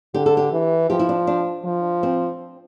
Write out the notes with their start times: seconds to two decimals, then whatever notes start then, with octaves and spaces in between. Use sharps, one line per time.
0.14 D3 G4
0.26 A4
0.37 G4
0.52 E3
0.90 F3 G4
0.99 E4
1.09 D4
1.27 D4
1.65 F3
2.03 C4